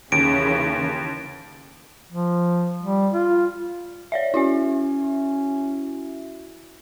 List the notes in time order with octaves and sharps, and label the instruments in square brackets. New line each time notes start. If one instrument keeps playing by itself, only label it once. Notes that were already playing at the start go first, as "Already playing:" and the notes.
[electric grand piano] D#2 [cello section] C#3 E3 [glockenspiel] D7
[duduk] F3
G3
F4
[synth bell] C#5 D5 E5
[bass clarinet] C#4 [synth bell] E4 F#4 E5